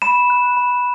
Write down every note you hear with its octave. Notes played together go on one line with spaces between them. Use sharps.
B5 E7
F#6
B5